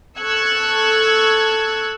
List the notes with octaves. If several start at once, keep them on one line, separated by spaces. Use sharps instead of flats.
A4 C#6 E6 F#6 G#6